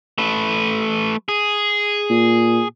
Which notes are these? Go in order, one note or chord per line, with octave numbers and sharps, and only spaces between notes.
A3 B4
G#4
A#2